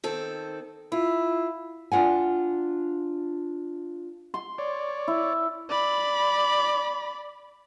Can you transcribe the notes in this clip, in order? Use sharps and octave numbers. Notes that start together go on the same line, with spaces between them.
D#3 C4 A4
E4 F4
D4 F4 F#5 G#5
C6
C#5 D5
E4
D5 B5